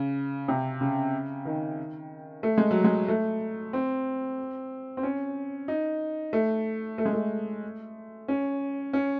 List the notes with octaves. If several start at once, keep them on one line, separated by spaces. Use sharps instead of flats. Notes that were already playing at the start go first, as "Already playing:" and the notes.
Already playing: C#3
C3
C#3
D#3
A3
G#3
F#3
G#3
A3
C4
C4
C#4
D#4
A3
A3
G#3
A3
C#4
C#4